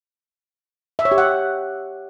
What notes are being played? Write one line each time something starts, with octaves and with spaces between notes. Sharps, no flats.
E5
C#5
G4
F#5